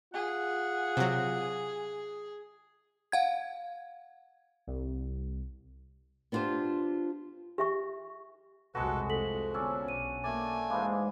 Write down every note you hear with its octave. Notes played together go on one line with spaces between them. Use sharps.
F4 G#4 F#5
C3 F#3
F5 F#5 G#6
C2
B3 D4 F4 G4 C5
G4 E5 C#6
F1 C2 G#3 F#4 A4 B4
F3 A4 B6 F#7
D3 B3 C#4 D4 E6
B1 D#7
A3 A#3 D5 G#5
G#2 E3 G#3 F5 D6